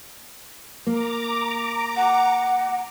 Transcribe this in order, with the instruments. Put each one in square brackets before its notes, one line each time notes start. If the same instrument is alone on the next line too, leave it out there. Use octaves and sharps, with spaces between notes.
[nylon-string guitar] A#3 [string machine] A#5 D6
[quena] F#5